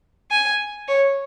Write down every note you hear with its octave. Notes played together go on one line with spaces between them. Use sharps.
G#5
C#5